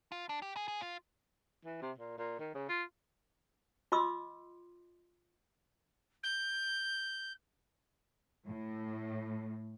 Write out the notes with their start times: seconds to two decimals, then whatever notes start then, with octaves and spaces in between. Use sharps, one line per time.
0.12 F4
0.29 D4
0.42 G4
0.56 G#4
0.68 G#4
0.81 F4
1.65 E3
1.82 C3
1.98 A#2
2.18 A#2
2.39 D#3
2.54 C#3
2.69 F4
3.92 F4 D#5 C6 D6 E6
6.23 G6
8.47 A2